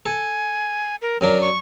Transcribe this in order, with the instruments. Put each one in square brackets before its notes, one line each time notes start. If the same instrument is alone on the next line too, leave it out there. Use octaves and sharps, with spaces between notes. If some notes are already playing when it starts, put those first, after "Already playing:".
[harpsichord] A4 [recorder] G#5
[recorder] A#4
[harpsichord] F#2 F#3 D4 [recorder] A#4
[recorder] C#6